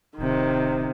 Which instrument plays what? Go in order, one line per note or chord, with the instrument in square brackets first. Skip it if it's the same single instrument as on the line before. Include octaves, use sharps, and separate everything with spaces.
[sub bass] D1 [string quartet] C3 D#3